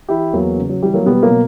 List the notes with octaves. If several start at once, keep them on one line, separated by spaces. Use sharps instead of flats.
E3 E4 G4
E2 F#3 A#3
C#3
F#3
E3 G3
F#3 A#3
B2 G3 B3
F#3 A#3
B2